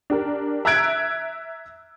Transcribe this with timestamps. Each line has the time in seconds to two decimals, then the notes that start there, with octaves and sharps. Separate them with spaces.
0.10 D4 G4 A#4
0.65 E5 A#5 E6 F#6 G#6 D7